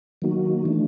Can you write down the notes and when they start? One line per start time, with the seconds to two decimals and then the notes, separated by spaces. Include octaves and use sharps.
0.22 D#3 F#3 A#3 D#4 F#4
0.65 E3 A3 D4